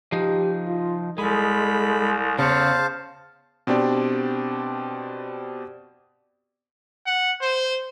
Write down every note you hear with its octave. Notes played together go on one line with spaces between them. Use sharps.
F3 D#4 G4
F4
C2 G#3 A4 B5
E2 C#3 C5 C#5 F5 A5
B2 C4 D4 G4 D5
F#5
C5